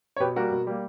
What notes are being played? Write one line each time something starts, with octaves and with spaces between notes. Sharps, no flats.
C#5
B2 G4 B4
G3 A#3 F#4 A#4
B2
G3 A#3